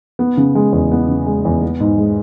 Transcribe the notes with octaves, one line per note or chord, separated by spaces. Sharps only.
B3
C#3
G#3
E2
B3
C#3
G#3
E2
B3
G#2
G#3